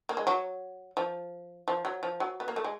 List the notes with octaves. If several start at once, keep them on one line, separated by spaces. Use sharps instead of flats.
A#3
G#3
F#3
F3
F3
F#3
F3
F#3
B3
A#3
A3
G#3